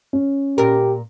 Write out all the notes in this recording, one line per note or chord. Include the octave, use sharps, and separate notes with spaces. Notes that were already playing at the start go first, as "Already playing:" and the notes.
C#4
A#2 G4 A#4